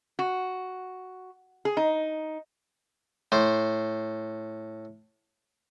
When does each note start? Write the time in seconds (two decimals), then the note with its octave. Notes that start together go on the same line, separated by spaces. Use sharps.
0.19 F#4
1.65 G#4
1.77 D#4
3.32 A2 C5